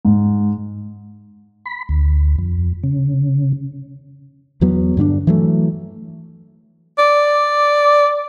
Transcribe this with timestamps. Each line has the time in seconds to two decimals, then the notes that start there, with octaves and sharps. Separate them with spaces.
0.05 G#2
1.66 B5
1.89 D2
2.38 F2
2.83 C#3
4.61 E2 F#3 B3
4.97 G2 D3 C#4 D4
5.27 E3 F#3 A3
6.98 D5